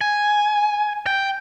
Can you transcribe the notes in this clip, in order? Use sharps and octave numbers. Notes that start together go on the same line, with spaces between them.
G#5
G5